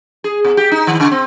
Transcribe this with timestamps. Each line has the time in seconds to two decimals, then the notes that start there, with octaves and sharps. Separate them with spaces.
0.24 G#4
0.44 B2
0.57 G4
0.72 D#4
0.87 D#3
1.00 C#3
1.11 C4